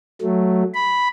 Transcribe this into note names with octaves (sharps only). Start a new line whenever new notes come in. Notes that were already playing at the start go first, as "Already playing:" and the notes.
F#3 A3
B5